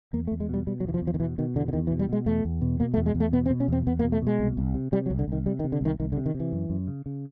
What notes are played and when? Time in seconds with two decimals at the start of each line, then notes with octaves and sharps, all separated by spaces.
0.13 E2 A#3
0.27 A3
0.31 E2
0.40 G#3
0.49 B2 G3
0.67 B2 G3
0.80 F#3
0.85 E2 E3
0.94 F3
1.02 E2
1.07 F3
1.14 D#3
1.20 B2 E3
1.38 B2 D#3
1.55 E2 D3
1.68 D3
1.73 E2 D#3
1.87 E3
1.91 B2
1.99 G3
2.09 B2 G#3
2.26 E2 A3
2.45 E2
2.61 B2
2.80 B2 A#3
2.94 A3
2.97 E2
3.06 G#3
3.15 E2
3.20 A3
3.32 B2 B3
3.46 C4
3.50 B2
3.60 C#4
3.68 E2 C4
3.87 E2 B3
3.99 A#3
4.03 B2
4.12 A3
4.22 B2 G#3
4.39 C2
4.57 C2
4.74 C3
4.92 C3 G3
5.06 F#3
5.10 C2
5.19 D3
5.28 C2 D#3
5.46 C3 G3
5.59 D#3
5.64 C3
5.72 D3
5.81 C2 D#3
6.00 C2 D#3
6.12 D3
6.16 C3
6.26 D#3
6.34 C3
6.40 E3
6.52 F#2
6.70 F#2
6.87 C#3
7.06 C#3